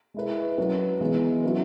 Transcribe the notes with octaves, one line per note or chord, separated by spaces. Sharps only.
G#3 E4 B4
F#3 C#4 F#4 B4
E3 G#3 B3
F#3 C#4 E4 B4